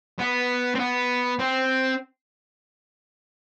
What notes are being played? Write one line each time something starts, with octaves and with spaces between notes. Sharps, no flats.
B3
C4
B3
C4